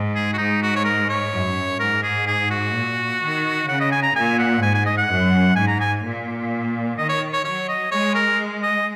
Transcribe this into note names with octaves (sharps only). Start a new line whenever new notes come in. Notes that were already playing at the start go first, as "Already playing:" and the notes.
Already playing: G#2
G#4
F#4
G#2 D#4
F#4
C#5
A#4
C#5
F#2
G#2 A#4
G#4
G#4
F#4
A#2
D#3
C#3 F#5
D#5
G#5
A#5
A#2 G#5
F#5
G#2 G#5
G#5
D#5
F#5
F#2
G#2 G#5
A#5
G#5
A#2
D#3 D#5
C#5
C#5
F#3 C#5
D#5
G#3 C#5
A#4
D#5